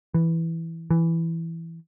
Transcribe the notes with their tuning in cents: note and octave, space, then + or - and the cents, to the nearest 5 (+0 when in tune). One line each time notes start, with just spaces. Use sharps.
E3 +0
E3 +5